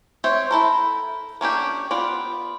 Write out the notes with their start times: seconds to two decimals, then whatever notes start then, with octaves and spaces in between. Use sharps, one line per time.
0.24 C4 C5 C#5 E5
0.51 E4 A4 A#4
1.41 A#3 C#4 D4 G4
1.91 B3 F4 D5